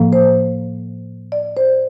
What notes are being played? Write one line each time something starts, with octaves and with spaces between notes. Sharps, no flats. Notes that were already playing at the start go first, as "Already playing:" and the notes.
Already playing: A2 F3 A#3
C5
D5
C5